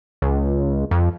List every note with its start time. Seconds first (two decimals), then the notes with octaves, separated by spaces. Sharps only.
0.22 C#2
0.91 F2